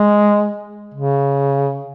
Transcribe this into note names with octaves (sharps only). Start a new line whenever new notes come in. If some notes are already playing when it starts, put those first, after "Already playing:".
Already playing: G#3
C#3